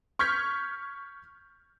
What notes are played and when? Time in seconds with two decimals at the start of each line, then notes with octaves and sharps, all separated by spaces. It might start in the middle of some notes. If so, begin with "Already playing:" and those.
0.19 C#6 F6 G6 G#6 B6